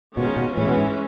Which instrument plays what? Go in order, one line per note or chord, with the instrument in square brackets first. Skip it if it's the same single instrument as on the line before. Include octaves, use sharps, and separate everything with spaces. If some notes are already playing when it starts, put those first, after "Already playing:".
[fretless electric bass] B2 [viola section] D#3 G#3 C#4 F4
[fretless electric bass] B2
[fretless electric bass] A2 [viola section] E3 G#3 C#4
[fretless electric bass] B2
G#2